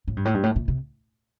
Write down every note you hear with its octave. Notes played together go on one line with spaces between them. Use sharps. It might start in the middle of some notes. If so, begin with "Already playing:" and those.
A2
G2
A2
G2
A2
A#2
C3